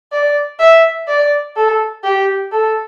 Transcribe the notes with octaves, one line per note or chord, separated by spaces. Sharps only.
D5
E5
D5
A4
G4
A4